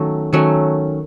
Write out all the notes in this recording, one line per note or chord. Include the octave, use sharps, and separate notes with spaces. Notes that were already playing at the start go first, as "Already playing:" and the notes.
Already playing: D#3 F#3 A3 C#4
D#3 F#3 A3 C#4